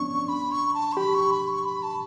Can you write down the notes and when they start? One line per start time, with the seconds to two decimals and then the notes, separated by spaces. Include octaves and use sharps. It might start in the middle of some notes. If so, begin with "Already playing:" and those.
Already playing: B3 C#4 D4 C#6
0.29 B5
0.52 C#6
0.74 A5
0.92 C#6
0.97 G4 B5
1.14 C#6
1.31 B5
1.48 C#6
1.65 B5
1.83 A5